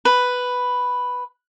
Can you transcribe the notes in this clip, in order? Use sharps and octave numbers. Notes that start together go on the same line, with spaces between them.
B4